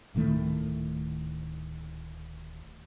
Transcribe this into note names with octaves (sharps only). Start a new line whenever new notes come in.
D1 A2 D#3 A3